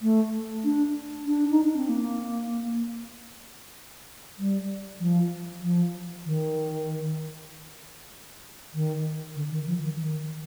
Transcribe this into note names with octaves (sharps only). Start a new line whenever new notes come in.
A3
D4
D4
D#4
D4
C4
A#3
G3
F3
F3
D#3
D#3
D3
D#3
F3
D#3
D#3